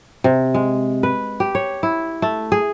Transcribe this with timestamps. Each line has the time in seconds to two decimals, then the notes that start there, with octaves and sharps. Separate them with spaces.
0.24 C3
0.54 G#3
1.03 B4
1.40 G4
1.55 C#5
1.83 E4
2.22 A3
2.52 G#4